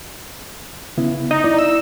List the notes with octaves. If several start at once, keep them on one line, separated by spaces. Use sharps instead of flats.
C#3 B3 E4
D#4
E4 D5
E6